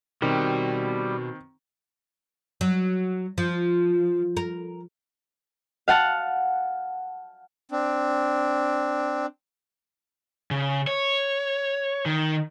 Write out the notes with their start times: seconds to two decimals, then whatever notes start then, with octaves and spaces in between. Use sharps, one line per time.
0.22 B2 D#3 G3 C4
2.61 F#3
3.38 F3
4.37 A#4
5.88 F5 F#5 A5
7.71 C4 D4
10.51 C#3
10.87 C#5
12.06 D#3